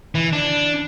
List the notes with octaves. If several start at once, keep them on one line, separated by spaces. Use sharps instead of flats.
E3
D4